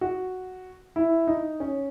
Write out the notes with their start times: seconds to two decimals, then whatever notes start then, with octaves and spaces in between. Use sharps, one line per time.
0.01 F#4
0.96 E4
1.27 D#4
1.60 C#4